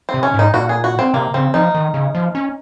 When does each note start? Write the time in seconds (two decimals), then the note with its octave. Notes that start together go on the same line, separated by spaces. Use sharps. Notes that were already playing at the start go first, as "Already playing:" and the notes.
0.09 C4
0.14 C3
0.23 C#4
0.34 G#2 D#4
0.54 A#2 F#4
0.69 G#4
0.84 F#4
0.99 C4
1.14 C3 A#3
1.34 C#3 C4
1.54 F3 D#4
1.75 D#3
1.94 C#3
2.15 F3
2.35 C#4